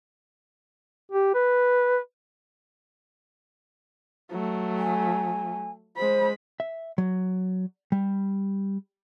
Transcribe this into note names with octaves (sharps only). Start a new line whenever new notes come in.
G4
B4
F#3 A3
G#5
G#3 C5 B5
E5
F#3
G3